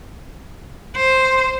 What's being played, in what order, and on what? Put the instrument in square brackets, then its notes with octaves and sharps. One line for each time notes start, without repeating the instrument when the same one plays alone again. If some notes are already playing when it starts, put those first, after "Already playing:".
[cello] C5